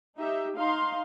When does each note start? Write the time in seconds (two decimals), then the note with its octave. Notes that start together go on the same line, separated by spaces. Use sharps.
0.18 D#4 G4 E5
0.56 D#4 F5 C6